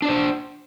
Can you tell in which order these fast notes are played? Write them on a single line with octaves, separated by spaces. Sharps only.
D4 D5 C5